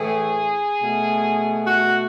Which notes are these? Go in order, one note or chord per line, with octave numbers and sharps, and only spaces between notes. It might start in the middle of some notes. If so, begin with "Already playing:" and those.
Already playing: A2 E3 A3 G#4
B2 A3
F#4